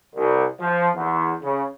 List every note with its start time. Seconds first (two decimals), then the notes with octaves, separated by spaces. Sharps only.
0.16 C2
0.59 F3
0.95 E2
1.42 C#3